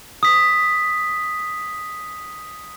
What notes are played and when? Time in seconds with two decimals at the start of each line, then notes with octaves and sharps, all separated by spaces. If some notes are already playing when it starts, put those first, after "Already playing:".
0.23 D#6 B6